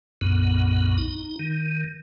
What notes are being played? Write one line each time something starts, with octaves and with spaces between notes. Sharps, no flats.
B1 F#2 A#2 B3
D#4
D#3